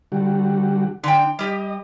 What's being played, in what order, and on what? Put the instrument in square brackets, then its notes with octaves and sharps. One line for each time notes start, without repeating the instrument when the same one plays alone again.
[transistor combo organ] D3 G3 F#4
[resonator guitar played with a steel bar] D3 G5 [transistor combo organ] D4
[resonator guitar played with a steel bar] G3 G4 [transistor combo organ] D#5